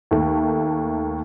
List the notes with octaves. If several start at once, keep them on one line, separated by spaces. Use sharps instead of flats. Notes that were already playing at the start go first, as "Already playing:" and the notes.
D#2 A3